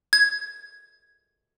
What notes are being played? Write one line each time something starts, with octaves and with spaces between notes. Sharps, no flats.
G#6